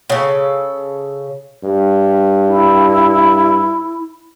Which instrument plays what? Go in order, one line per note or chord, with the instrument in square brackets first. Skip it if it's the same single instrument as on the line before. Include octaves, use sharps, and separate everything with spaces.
[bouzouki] C#3 A4
[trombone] G2
[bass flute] E4